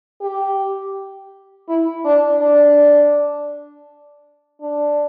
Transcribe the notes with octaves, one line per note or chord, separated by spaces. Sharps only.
G4
E4
D4
D4
D4